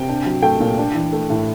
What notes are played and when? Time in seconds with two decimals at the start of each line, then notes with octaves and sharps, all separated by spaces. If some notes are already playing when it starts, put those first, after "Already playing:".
Already playing: C3 G5
0.09 D4
0.26 F#3
0.43 A3 G5
0.60 A#2
0.78 D4
0.95 E3
1.13 A3
1.30 A2